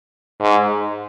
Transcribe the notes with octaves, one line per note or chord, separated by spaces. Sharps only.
G#2